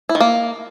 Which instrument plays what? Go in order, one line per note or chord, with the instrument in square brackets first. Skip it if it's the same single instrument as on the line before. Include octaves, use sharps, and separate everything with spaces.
[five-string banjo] E4
D#3
A#3